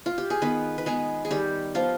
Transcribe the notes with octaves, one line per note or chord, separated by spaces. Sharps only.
F4
G4
G#4
D#3 B3 B4
B4
G#3 B3 G#4
G#4
D#3 G3 G4
F3 B3 F4